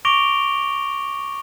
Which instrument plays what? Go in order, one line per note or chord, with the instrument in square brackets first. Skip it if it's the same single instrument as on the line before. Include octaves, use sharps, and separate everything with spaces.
[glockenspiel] C#6 D6 A#6 D7 F7 G7